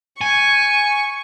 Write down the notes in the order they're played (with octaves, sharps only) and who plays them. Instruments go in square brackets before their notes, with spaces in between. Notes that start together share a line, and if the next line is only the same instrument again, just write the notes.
[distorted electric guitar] G#5 [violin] C#6